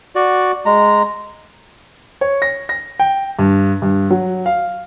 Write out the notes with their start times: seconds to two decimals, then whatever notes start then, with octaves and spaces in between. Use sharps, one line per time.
0.15 F#4 D5
0.66 G#3 A#5
2.21 C#5
2.42 A#6
2.69 A#6
3.00 G5
3.39 G2
3.82 G2
4.11 F#3
4.46 F5